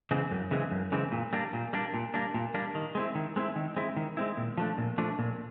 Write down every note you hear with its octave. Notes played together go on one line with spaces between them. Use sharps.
C#3 E3 G#3 C4
F#2
C#3 E3 G#3 C4
F#2
C#3 E3 G#3 C4
A#2
G3 A#3 D4
A#2
G3 A#3 D4
A#2
G3 A#3 D4
A#2
G3 A#3 D4
D#3
G#3 C4 E4
D#3
G#3 C4 E4
D#3
G#3 C4 E4
D#3
G#3 C4 E4
A#2
F3 A3 D4
A#2
F3 A3 D4
A#2